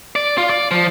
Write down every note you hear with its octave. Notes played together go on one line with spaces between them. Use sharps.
D5
F4
D5
F3